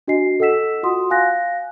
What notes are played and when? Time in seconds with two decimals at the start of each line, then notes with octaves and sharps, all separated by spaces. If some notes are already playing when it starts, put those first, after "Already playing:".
0.08 D4 F#4 D#5 G#5 C7
0.40 A4 D#5 F#5 E6 B6 E7
0.83 F4 F#4 F#5 C6 D#6
1.10 F5 G#5 F#6 A#6